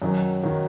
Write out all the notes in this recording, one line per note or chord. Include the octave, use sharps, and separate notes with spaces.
F#2 D#3 F#3
D#3 F#3